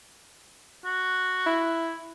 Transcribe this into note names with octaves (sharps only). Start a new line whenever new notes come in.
F#4
E4